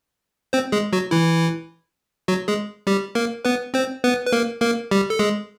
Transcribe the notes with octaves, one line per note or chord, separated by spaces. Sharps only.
C4 C5
G#3 G#4
F#3 F#4
E3 E4
F#3 F#4
G#3 G#4
G3 G4
A#3 A#4
B3 B4
C4 C5
B3 B4
B4
A#3 A#4
A#3 A#4
G3 G4
A4
G#3 G#4